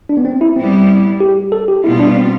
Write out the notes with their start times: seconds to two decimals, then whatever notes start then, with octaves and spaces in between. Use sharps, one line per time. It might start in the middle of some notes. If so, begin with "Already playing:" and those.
0.09 D4
0.17 B3
0.25 C4
0.41 E4
0.56 A2 G3 B3 C4 E4
1.20 G4
1.52 A4
1.68 G4
1.84 B2 G3 B3 E4 F4
2.00 D4
2.16 C4